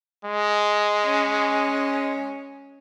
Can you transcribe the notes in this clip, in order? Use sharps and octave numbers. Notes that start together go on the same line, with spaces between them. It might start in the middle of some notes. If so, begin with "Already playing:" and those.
G#3
C#4